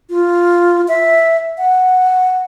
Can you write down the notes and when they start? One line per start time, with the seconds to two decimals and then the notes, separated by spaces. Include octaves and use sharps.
0.10 F4
0.88 E5
1.58 F#5